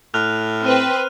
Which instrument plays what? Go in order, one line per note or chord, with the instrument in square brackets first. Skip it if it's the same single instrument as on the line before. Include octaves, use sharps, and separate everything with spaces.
[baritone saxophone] A2 [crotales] F6 F#6 F7
[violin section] C4 B4 [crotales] F6 D#7